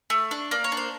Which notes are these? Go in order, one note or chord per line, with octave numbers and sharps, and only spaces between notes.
A3
D4
A#3 D5
C#5
D4
C5